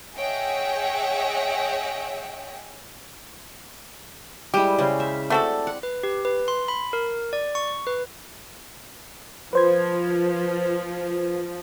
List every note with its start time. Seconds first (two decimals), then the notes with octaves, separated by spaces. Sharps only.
0.18 G#4 C#5 D#5 E5 F#5 G5
4.54 G3 G#3 E4 G4
4.79 C#3 C#4 C5
5.00 E5
5.30 A3 C4 F#4 A4 D5
5.67 F#5
5.83 B4
6.03 G4
6.25 B4
6.48 C6
6.68 B5
6.93 A#4
7.33 D5
7.55 C#6
7.87 B4
9.53 F3 B4 C5 G#6